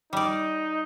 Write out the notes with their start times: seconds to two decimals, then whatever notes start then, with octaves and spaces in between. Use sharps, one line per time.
0.13 G3 D#4 D5